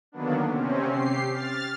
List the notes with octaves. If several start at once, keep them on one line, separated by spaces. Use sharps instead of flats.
D3 D#3 F#3 A#3 B3 D4
C3 C4 C#4
G4 C7
F6 A6